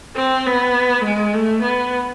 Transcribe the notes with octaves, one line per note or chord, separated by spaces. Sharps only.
C4
B3
G#3
A3
B3